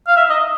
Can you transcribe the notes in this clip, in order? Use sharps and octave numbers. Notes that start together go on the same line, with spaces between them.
F5
E5
D#5